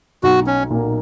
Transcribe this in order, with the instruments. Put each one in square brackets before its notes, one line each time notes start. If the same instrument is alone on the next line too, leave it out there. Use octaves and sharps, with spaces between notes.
[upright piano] B1 [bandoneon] F#4
[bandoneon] C#4
[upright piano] A#2 A#3